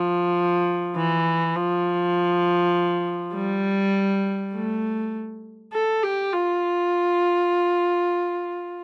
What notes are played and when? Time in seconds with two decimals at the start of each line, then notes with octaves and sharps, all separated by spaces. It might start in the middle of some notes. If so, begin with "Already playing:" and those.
Already playing: F3
0.96 E3
1.55 F3
3.35 G3
4.54 A3
5.73 A4
6.03 G4
6.33 F4